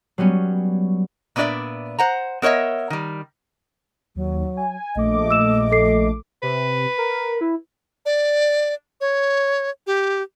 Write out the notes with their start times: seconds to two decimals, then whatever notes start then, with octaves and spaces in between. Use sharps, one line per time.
0.18 F#3 G3 B3 C#4
1.36 A#2 B3 D4 F4 D5 E5
1.99 C5 F#5 A#5
2.42 B3 A#4 C#5 D#5 E5
2.90 D#3 G3
4.16 D#2 F#3
4.57 G#5
4.96 A#1 A3 D#5 D6
5.31 E6 E7
5.72 A4 C7
6.43 C3 B4
6.98 A#4
7.41 E4
8.06 D5
9.01 C#5
9.87 G4